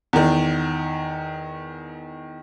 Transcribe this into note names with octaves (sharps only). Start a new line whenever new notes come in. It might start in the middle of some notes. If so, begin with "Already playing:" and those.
E2 D#3